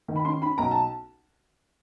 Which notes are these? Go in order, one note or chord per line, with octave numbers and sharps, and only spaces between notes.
D#3
B5
C#4 C6
C#4 B5
B1 A#5
A5